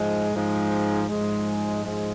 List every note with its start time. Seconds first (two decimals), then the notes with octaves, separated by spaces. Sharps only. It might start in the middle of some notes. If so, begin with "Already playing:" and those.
Already playing: G#2 F3 G#3
0.34 G#2 F3 G#3
1.09 G#2 F3 G#3
1.84 G#2 F3 G#3